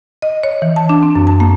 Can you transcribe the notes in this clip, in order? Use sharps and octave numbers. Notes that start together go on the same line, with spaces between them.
D#5
C#5
E3
A5
D4
C4
F#2
A5
A#3